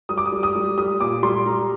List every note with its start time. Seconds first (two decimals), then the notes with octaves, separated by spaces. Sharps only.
0.09 G3 D#6
0.18 D6
0.26 D#6
0.32 G3
0.43 D#6
0.55 G3
0.78 G3 D#6
1.00 A#2 D6
1.23 G3 C6
1.46 G3 A#5